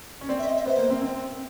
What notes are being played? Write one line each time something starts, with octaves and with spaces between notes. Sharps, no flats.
C#4
C4 D5
E5
D#5
E5
B3 C5
A#3
C4
C4